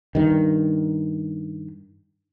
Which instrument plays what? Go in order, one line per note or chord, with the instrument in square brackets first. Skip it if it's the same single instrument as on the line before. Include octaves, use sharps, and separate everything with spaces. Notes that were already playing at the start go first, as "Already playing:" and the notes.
[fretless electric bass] G2 D#3